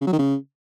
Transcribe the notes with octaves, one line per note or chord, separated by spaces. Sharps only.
C#3
F#3
D#3
C#3